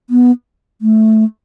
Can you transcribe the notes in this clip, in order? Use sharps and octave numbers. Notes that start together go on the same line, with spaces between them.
B3
A3